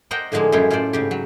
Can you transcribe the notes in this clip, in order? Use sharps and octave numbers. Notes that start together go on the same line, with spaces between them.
A#4 C5 D5 D#5 F#5 G5
A2 D3 F3 G#3 A#3
F#2 G#3 E4 F4 G5
A2 F4 A4 C5 D5
G#2 C#3 G4
F#3